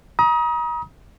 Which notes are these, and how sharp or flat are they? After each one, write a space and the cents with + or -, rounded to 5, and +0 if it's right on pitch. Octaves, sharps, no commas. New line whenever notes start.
A#5 +40 D#6 +25